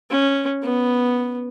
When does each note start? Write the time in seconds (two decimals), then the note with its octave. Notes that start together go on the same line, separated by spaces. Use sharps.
0.10 C#4
0.63 B3